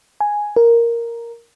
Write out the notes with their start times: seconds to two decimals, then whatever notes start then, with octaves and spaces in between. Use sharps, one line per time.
0.21 G#5
0.56 A#4